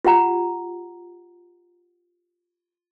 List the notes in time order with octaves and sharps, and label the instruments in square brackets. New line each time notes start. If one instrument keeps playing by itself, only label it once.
[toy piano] F4 G4 F#5 A#5